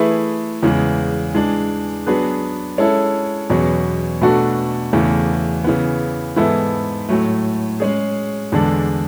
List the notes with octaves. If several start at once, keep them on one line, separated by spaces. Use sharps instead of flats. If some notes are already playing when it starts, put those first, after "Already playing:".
Already playing: E3 A3 E4 G#4 B4
E2 C#3 E3 G#3
E3 G#3 D4
F#3 B3 D4 G#4 B4
G#3 C#4 E4 A4 C#5
E2 B2 F#3 C#4 G#4
B2 A3 D4 F#4 A4
E2 C#3 E3 A3
C#3 E3 B3
G#2 E3 B3 E4 A4
A2 F#3 A3
G#3 C#4 G#4
E2 D3 G#3 D4 A4